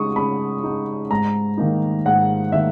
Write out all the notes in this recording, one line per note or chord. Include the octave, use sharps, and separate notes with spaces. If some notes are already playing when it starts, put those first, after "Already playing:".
Already playing: C#3 G#3 D#4 C#6 D#6
C#3 B5
G#3 D#4
G#2 A#5
D#3 A#3 D#4
G#2 F#5
D#3 A#3 E5